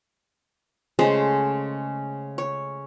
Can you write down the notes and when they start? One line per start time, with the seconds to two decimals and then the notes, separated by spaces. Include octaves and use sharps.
0.99 C#3 G#3 A3 C5
2.38 C#5